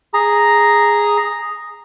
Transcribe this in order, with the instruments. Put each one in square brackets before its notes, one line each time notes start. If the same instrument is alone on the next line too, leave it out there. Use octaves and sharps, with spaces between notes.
[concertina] G#4 A#5